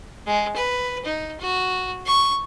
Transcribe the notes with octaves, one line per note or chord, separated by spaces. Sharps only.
G#3
B4
D#4
F#4
C#6